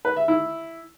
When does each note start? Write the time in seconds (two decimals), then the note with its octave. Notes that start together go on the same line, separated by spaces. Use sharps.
0.05 B4
0.16 E5
0.28 E4